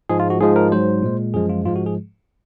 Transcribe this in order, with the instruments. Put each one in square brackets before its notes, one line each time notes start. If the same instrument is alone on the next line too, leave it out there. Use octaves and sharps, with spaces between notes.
[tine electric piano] G#2 F3 G#3 G#4
F4
F#4
G#2 F3 G#3 G#4
A#4
G#2 F#3 C5
A#2 G#3
F#2 F3 G#3 G#4
F4
G#2 F3 G#3 F4
F#4
G#4